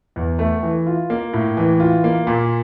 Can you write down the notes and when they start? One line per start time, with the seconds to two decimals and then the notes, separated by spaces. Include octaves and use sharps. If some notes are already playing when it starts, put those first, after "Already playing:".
0.16 E2
0.39 A3
0.63 E3
0.87 F4
1.10 A#3
1.33 A2
1.57 E3
1.80 F4
2.04 A#3
2.27 A#2